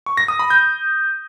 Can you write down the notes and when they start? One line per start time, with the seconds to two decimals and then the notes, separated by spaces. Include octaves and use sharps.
0.06 C#6
0.17 A#6
0.28 D#6
0.39 B5
0.50 G6